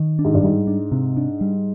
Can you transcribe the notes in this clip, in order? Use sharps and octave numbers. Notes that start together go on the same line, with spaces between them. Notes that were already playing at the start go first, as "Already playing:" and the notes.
Already playing: D#3
D4
G#2
G2
G#2 G3
D4
C3
D4
G3